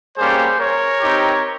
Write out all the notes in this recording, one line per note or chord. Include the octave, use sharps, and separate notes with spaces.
G3 A#3 C#4 G4 G#4 C5
A#4 C#5
C4 D#4 G4